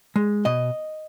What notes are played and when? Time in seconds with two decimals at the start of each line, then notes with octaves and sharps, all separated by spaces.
0.16 G#3
0.45 B2 D#5